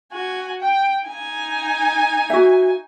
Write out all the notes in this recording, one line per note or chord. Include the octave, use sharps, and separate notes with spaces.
F#4 G#5
G5
D#4 G#5
F#4 E5